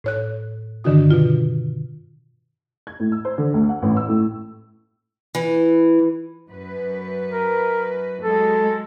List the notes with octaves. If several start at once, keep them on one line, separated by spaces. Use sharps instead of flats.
A2 C#5 F#6
G2 D3 D#3 D4 F#4 D#6
B2 F4
G#6
A2
E6
C5
D3
D2
F#5
A1
E6
A2
E3
F#2 B4
A#4
F#3 G#3 A4